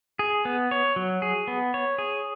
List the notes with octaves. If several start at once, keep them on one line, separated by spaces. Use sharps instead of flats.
G#4
B3
C#5
F#3
G#4
B3
C#5
G#4